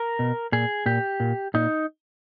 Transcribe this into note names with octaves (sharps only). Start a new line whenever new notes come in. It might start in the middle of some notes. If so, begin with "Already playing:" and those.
Already playing: A#4
B2
A#2 G#4
A#2 G4
A#2
A#2 D#4